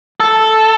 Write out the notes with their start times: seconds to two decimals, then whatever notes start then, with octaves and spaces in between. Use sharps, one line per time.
0.20 A4